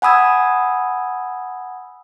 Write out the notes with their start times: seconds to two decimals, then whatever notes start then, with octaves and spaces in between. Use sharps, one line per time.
0.02 F#5 G#5 B5 D#6 E6 G#6